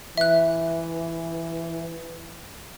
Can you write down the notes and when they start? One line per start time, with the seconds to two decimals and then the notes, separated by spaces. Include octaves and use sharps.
0.17 E3 E5 F#6